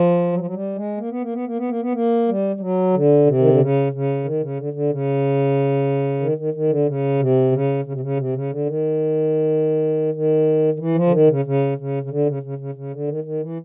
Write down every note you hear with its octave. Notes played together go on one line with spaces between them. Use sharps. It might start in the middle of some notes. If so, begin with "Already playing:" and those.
Already playing: F3
F#3
F3
F#3
G3
G#3
A#3
B3
A#3
B3
A#3
B3
A#3
B3
A#3
G3
G3
F#3
D3
C3
D#3
D3
C#3
C#3
D#3
C#3
D3
D3
C#3
D#3
D#3
D#3
D3
C#3
C3
C#3
C#3
C3
C#3
C3
C#3
D3
D#3
D#3
D#3
E3
F3
D3
D#3
C#3
C#3
C#3
C#3
D3
C#3
C#3
C#3
C#3
D3
D#3
D#3
E3